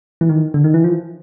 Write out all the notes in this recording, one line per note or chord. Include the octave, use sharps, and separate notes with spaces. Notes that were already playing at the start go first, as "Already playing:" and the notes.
E3
D#3
D3
D#3
E3
F3